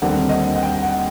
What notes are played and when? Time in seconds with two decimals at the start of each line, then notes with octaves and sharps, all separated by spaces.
0.02 D#2 D3 G3 C4 F#5
0.29 D#5
0.55 F#5
0.62 G5
0.69 F#5
0.82 F#5